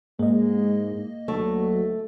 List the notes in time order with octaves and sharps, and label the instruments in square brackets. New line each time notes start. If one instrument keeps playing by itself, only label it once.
[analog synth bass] G#2 [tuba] G#3 [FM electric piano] A#3 D#5
[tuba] D2 [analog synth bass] F#3 [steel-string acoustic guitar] A3